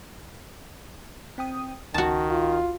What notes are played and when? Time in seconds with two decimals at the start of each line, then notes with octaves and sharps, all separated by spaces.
1.38 C4 G5 D#6
1.94 C#2 D#3 F#4 A5
2.30 F4